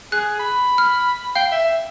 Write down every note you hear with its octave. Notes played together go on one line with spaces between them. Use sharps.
G#4 F#6
B5
F6
F5 G5
E5